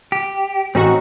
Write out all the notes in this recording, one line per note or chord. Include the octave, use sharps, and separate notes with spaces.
G4
A1 C4 C#4 D#4 F#4